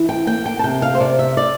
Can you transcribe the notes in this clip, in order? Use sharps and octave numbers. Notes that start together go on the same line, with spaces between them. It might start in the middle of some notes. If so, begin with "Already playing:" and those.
Already playing: E3
G5
A#3 G5
G5
A5
C3 G5
F5
C5
C3 D5
E5
D5